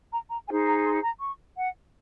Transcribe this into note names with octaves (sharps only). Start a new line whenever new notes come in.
A#5
A#5
D#4 G#4 C5 G#5
A#5
C6
A#5
C#6
F#5